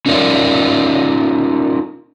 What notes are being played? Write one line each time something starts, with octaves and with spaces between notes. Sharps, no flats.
C#4 D#4 F4 A#4 D5